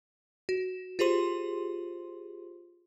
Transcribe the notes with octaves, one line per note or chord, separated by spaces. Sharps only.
F#4
F4 G4 G#4 C5 C6